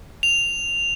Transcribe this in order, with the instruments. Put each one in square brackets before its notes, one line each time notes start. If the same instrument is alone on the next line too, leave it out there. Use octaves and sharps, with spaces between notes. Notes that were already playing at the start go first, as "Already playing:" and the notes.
[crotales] F7